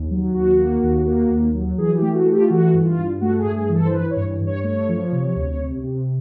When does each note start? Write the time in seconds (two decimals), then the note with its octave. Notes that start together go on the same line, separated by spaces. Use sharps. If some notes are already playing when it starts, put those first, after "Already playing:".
Already playing: D#2
0.11 F#3
0.34 D#2 F#4
0.58 A#3
0.83 D#2
1.07 A#3
1.31 D#2
1.54 F#3
1.78 E3 G#4
1.96 G4
2.02 A3
2.14 F#4
2.26 A3
2.32 G4
2.41 F4
2.50 E3 F#4
2.74 G2
2.85 F4
2.98 G2
3.21 A3 F#4
3.39 G#4
3.45 G2
3.57 G#4
3.69 E3
3.75 A4
3.86 C5
3.93 E3 B4
4.11 C#5
4.17 G2
4.41 G2
4.47 C#5
4.64 A3 C#5
4.89 F3
5.12 C3
5.36 D2
5.60 C3
5.83 C3